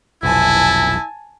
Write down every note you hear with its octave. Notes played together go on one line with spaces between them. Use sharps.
F1 B1 E4 G#5 A5